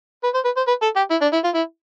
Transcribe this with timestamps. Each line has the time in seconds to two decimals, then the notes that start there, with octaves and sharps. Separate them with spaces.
0.24 B4
0.34 C5
0.45 B4
0.56 C5
0.67 B4
0.82 A4
0.96 G4
1.10 E4
1.21 D4
1.33 E4
1.44 F4
1.54 E4